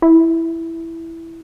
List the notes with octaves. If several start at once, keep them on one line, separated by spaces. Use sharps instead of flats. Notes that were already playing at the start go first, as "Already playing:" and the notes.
E4